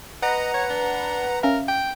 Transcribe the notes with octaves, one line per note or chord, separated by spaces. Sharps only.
B4 D#5 F#5 A#5 F#6
C#5
D4
C#4 A#4 E5 F5
G5